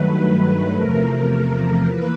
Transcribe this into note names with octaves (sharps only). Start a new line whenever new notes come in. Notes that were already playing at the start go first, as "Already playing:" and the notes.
Already playing: G2 D#3 F#3 A3 B4
B4
E2 C3 F3 A3 A#4
E3 A#3 B4